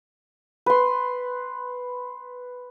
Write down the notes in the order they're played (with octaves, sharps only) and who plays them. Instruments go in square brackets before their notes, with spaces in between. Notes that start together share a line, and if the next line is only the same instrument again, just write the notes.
[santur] B4 C6